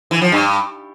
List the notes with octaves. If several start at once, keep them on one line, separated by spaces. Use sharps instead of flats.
E3
F3
G2